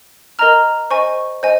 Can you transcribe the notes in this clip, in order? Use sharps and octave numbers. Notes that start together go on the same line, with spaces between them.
A#4 D#5 A#5 F6
C5 D#5 G#5 C#6
C5 D#5 G#5